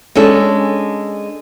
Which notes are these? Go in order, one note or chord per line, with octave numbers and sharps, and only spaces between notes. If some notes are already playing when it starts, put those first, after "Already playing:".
G#3 C#4 D4 A4